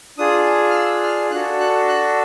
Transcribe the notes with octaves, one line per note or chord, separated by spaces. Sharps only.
D4 F4 G#4 D#6
F6
E6
F6
D4 F#4 A4 F#6
F#6
F#6